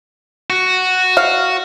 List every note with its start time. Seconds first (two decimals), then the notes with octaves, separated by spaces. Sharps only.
0.50 F#4
1.17 F5